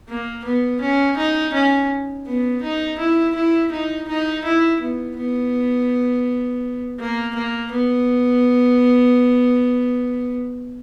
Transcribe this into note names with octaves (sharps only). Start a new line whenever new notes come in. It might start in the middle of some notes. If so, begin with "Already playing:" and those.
A#3
B3
C#4
D#4
C#4
B3
D#4
E4
E4
D#4
D#4
E4
B3
B3
A#3
A#3
B3